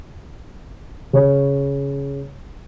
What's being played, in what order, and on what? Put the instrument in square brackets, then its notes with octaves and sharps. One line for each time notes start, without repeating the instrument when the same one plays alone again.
[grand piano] C#3 C#5